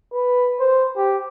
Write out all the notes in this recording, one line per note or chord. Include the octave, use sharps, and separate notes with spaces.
B4
C5
G4